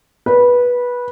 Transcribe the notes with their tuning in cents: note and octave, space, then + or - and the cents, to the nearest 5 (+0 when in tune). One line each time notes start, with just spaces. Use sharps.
B4 -15